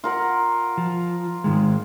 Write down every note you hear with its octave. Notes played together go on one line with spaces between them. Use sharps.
F4 A#4 F#5
F3
G#2 D#3 G#3